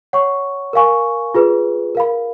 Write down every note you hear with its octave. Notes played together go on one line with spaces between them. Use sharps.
C#5 F#5 C#6
A#4 F5 G#5 C#6
F4 G#4 B4
A#4 F5 B5